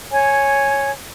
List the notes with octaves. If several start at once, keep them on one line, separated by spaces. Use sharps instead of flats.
C#5 G#5